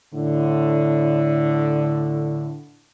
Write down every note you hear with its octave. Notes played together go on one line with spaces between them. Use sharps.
A2 D3